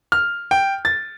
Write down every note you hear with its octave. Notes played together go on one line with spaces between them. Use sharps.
F6
G5
A6